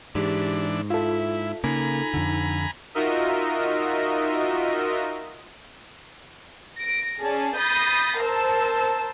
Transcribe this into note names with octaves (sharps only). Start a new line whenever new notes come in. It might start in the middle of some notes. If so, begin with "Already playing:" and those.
G#2 E3 D4 G4
E4 F4 A4 E5
C#3 A#3 D#4 G#5 A#5 B5
F2 D3
D#4 F4 F#4 A#4 D#5 E5
A#6 D7
C#4 G#4 D5 A5
B5 D#6 G6 A6 A#6 C7
A#4 C5 A5 E6